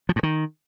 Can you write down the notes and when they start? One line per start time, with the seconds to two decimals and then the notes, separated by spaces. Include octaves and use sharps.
0.09 F3
0.16 G2
0.23 D#3